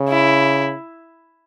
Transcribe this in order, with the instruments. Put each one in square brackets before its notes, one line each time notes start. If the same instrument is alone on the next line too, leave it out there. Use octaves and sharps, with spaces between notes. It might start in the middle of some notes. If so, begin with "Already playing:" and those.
Already playing: [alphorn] C#3
[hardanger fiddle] E4